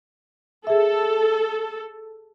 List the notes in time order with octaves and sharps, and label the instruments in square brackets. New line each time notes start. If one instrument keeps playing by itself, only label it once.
[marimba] G#4 E5 [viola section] A4